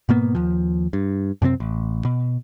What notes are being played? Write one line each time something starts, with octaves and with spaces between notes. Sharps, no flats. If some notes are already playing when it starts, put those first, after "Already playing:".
G#2 B2 A#3 B3
D#2 F3
G2
F#2 C3 B3 C4
A1
B2